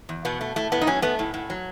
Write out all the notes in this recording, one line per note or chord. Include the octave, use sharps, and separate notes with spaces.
E2
B2 B3
A3
A2 A3
A2 B3
D#4
F#3 C#4
A3 B3
A2
A2
F#3